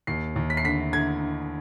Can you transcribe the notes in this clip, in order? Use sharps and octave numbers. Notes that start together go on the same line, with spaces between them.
D#2 C7
D#2
B6
C7
D3 B6
D3 G#6